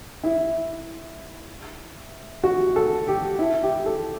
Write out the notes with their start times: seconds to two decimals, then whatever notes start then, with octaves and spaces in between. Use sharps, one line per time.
0.24 E4
2.43 F#4
2.76 A4
3.08 G4
3.39 E4
3.63 G4
3.86 A4